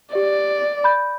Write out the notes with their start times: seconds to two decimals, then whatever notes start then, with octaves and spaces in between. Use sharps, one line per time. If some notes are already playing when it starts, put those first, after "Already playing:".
0.15 G4 D5
0.84 B5 G6